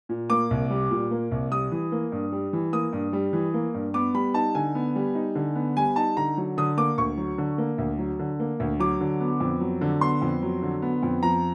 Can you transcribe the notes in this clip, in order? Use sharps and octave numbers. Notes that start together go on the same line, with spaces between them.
A#2
A#3 D6
C2
G3
A#2
A#3
C2
G3 D#6
E3
A#3
G2
G3
E3
A#3 D#6
G2
G3
E3
A#3
G2
B3 D6
G3 B5
D#4 A5
D3 G#5
B3
G3
D#4
D3
B3
G3 G#5
D#4 A5
D3 A#5
F#3
D3 D#6
A#3 D6
D2 C#6
F#3
D3
A#3
D2
F#3
D3
A#3
D2
F#3 D6
D3
B3
F2
F#3
D3
B3 C6
F2
F#3
D3
B3
F2
F3 A#5